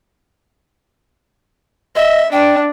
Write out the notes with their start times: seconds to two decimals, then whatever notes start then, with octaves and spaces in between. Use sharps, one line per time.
1.96 D#5 E5
2.32 D4 G5